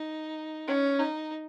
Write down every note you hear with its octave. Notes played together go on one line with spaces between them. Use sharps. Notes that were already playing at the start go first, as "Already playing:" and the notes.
Already playing: D#4
C#4
D#4